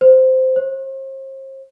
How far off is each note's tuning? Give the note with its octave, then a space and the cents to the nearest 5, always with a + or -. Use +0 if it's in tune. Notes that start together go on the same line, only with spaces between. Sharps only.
C5 -10
C5 +40